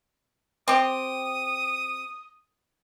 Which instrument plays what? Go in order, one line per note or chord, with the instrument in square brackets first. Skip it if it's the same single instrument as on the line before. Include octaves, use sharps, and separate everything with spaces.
[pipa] C4 G4 [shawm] D#6